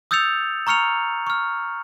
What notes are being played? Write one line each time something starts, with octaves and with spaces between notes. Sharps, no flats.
D#6 E6 G6 A6 C#7 F7
A#5 C#6 F6 C#7 F7
C#6 F6